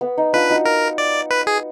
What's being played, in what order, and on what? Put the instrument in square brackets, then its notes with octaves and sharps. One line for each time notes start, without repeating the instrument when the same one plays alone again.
[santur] B3
D#4
[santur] D4 F4 [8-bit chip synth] B4
[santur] D#4 F#4
[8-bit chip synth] A#4
D5
B4
G#4